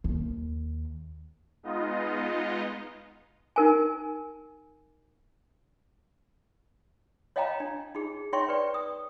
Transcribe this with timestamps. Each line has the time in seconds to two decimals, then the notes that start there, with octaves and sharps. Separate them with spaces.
0.04 D#2
1.63 G#3 B3 D#4 F4 D#5
3.56 D#4 A#4 G#5
7.36 C#5 D#5 F5 G5 A5 A#5
7.60 D4
7.95 D#4 G#4
8.33 D#4 C#5 E5 G5 C6 C#6
8.49 B4 D5 G5
8.74 D#6